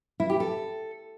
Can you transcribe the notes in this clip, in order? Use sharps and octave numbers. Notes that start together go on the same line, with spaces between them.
E4
G4
A4